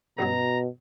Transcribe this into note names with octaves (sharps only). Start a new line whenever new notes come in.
A1 G2 B2 F#3 A#5